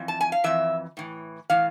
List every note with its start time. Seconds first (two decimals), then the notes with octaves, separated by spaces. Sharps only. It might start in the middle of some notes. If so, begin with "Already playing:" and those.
Already playing: F2 E3
0.08 A5
0.21 G#5
0.32 F5
0.44 F2 E3 E5
0.97 A2 E3
1.50 A2 E3 F5